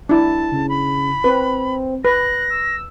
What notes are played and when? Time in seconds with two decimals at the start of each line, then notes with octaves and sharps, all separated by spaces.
0.09 D4 E4 A5
0.51 C#3
0.69 B5
1.24 C4 B4
2.05 B4 F#6 A#6
2.50 E6